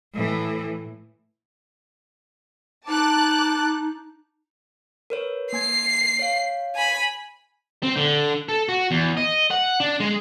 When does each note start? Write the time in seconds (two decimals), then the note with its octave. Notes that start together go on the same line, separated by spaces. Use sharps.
0.14 A2 E3
2.88 D#4 A5 D6 F#6
5.10 A#4 B4 C#5
5.53 A#3 G#5 G#6 C7
6.19 C#5 F5
6.76 G#5 B5
7.83 C4
7.97 D3
8.49 A4
8.69 F#4
8.91 E2
9.17 D#5
9.51 F#5
9.80 D4
10.00 G#3